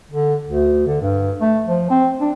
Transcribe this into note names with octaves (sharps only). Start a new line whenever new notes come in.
D3
D2
D3
G2
A3
F3
C4
D4